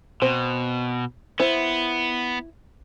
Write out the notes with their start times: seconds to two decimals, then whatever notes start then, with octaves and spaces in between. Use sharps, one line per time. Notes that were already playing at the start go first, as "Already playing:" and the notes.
0.22 B2 C4 C5
1.40 B3 E4 C5